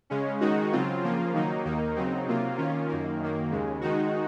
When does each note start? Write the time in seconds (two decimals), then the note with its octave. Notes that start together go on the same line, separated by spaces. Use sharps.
0.10 C#3 G#3 C#4
0.41 D#3 G#3 D#4 F#4
0.72 C#3 F#3 C4 F4
1.03 C#3 F3 A#3 F4
1.34 D#3 F#3 A#3 D#4
1.65 D#2 D#3 A#3 D#4
1.96 C#3 F#3 C4 D#4
2.27 C3 F#3 A#3 F4
2.57 D#3 A#3 C#4 F4
2.89 F#2 D#3 A#3
3.19 F#2 D#3 A#3
3.51 D#2 C#3 G#3
3.81 D#3 G#3 D#4 F#4